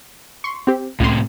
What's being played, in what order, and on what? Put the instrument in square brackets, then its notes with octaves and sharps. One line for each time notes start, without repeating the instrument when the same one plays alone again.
[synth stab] C6 C#6
C4 G4
[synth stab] C#2 C6 [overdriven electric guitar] A2 C3